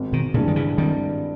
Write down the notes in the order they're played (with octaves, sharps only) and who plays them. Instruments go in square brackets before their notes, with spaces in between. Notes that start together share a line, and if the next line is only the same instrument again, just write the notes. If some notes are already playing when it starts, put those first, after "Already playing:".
Already playing: [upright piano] G#1
[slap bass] B2 D#3
[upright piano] G2 E3 G#3 [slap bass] A#2 C#3
[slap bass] D#3
C#3 E3
[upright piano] G#1 [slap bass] D#3 G3